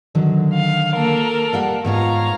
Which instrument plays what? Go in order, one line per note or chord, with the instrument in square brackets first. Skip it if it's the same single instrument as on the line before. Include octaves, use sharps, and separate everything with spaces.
[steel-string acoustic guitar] D3 D#3 F#3
[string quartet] F5
A#3 A4 A#4
[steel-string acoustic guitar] G3 F5 F#5
[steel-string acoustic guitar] G#2 B3 F4 [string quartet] C#5 F5 A#5